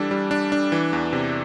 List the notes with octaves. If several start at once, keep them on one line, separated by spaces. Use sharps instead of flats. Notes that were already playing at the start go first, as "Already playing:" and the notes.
Already playing: E3 G3 D4 A4
G3
D4
D4
E3
E2
C3